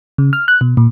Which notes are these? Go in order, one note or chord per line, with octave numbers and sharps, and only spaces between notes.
C#3
F6
F#6
B2
A#2